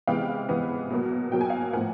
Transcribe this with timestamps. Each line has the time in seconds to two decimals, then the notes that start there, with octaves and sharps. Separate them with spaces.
0.07 C3 E3 G#3 B3 F5 G5
0.49 C3 E3 G#3 B3
0.90 B2 F#3 A#3
1.31 B2 F#3 A#3 G5
1.41 G#5
1.49 F5 G5
1.73 A2 F3 A#3 F#5 G#5